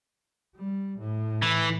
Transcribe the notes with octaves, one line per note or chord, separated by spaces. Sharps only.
G3
A2
E3